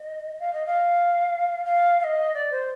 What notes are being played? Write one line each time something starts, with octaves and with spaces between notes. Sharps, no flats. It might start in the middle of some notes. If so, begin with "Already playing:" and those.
Already playing: D#5
F5
D#5
F5
F5
F5
D#5
D5
C5